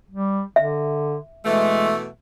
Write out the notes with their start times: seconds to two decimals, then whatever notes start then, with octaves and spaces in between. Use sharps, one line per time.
0.11 G3
0.56 D3 E5
1.45 B2 E3 G#3 A3